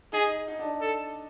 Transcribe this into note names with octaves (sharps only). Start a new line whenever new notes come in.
D#4 G#4
D#4
D4
A4